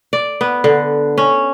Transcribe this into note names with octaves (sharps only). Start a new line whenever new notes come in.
D5
B3
D3
C#4